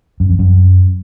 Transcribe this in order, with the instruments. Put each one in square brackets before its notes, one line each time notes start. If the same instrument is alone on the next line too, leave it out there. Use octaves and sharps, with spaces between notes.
[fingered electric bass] F#2
F2
F#2